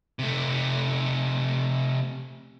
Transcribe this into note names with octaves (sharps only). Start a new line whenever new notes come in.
C3 A3